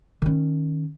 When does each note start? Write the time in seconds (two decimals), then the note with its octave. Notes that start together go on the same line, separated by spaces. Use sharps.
0.22 D#3 C#4